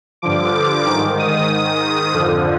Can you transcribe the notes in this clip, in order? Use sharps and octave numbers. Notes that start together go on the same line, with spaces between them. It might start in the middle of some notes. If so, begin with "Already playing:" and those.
G2 D3 F3 D6
G#2 D#3 D6
D#6
G#2 D#3 D#6
F2 D3 F3